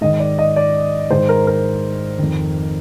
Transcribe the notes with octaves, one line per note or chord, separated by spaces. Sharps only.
G#2 D#3 D#5
D5
D#5
D5
G#2 D#3 C5
A#4
A#4
F2 D#3